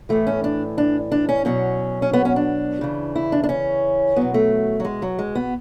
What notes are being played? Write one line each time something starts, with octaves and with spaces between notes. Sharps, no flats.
A2 E3 A3
C#4
D4
D4
D4
C#4
B2 F#3 C#4
C#4
B3
C#4
D4
C#3 E3
E4
D4
D4
C#4
B2 F#3 B3
A3
F#3
G#3
F#3
G#3
B3